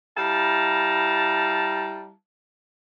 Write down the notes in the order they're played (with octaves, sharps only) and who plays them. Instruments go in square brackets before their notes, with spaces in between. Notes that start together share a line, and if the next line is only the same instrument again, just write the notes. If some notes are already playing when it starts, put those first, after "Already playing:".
[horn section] G3 E4 F5 A5 A#5